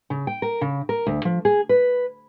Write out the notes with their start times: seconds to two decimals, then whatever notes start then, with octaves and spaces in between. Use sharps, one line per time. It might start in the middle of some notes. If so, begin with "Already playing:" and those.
0.10 C#3
0.27 G5
0.42 A#4
0.61 C#3
0.89 A#4
1.07 D2
1.25 F3
1.45 G#4
1.69 B4